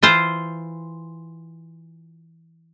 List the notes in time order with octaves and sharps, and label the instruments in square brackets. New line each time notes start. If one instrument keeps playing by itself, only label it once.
[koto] E3 F4 C5